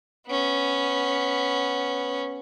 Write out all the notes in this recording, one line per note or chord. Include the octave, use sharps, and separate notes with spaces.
B3 C#4